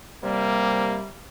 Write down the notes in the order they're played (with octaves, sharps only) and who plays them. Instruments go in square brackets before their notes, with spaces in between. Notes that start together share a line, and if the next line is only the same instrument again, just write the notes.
[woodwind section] C3 G3 [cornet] A#3